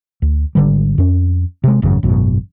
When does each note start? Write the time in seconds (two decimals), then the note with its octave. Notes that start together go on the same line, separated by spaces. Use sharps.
0.22 D2
0.55 G#1 D3 G3
0.98 F2 C#4
1.64 C3 G#3
1.82 G#1 F#2 C#3
2.03 G#1 F#2 B2